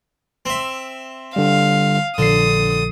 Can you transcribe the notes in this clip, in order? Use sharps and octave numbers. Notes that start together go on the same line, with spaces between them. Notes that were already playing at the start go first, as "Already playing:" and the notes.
C4 E5
D3 G3 F5
A#1 D3 D#6 C7